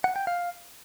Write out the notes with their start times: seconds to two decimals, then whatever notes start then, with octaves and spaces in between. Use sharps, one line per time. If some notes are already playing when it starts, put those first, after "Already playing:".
0.04 F#5
0.16 G5
0.27 F5